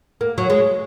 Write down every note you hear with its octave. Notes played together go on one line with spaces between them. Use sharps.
A#3
F#3
G#3